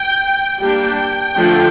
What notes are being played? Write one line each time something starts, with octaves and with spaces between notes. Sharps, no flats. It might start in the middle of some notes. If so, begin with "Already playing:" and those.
Already playing: G5
G3 A#3 D4 G5
D3 F3 A3 D4